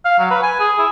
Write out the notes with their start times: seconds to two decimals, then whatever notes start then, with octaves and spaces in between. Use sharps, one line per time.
0.05 F5
0.19 F#3
0.31 B4
0.43 G#5
0.60 G#4
0.79 E4